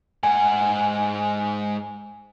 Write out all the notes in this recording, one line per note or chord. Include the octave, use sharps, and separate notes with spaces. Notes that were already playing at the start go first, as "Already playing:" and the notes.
G#2 F#5 G#5